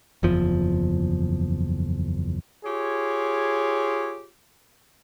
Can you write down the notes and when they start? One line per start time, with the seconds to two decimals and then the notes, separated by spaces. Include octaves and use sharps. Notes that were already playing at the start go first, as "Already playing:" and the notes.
0.23 F#1 E2 F3
2.65 F4 G4 G#4 C#5